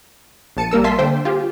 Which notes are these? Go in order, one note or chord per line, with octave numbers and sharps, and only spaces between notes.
A#1 A5 C#7 D#7
G3 A#3 A#4 E6
E5 F5 G#5 A5 C6 B6
D3 C5 G5
F4 G4 G#4